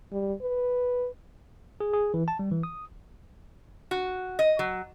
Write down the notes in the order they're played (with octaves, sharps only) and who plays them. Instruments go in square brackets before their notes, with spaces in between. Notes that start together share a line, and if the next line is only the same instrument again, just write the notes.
[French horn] G3
B4
[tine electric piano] G#4
G#4
E3
A5
G3
E3
D#6
[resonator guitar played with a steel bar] F#4
D#5
F#3